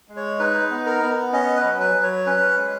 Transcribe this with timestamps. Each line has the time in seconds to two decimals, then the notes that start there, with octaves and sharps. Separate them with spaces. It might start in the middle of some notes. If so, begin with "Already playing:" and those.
0.09 G#3
0.16 C#5
0.39 D#4 B4
0.71 B3
0.86 A#4
1.02 B3
1.33 C#4 D#5
1.56 B4
1.63 F#3
1.80 B4
1.95 F#3
2.03 C#5
2.26 C#4 B4
2.57 G#3